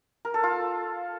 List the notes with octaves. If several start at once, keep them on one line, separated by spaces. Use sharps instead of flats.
A#4
A4
F4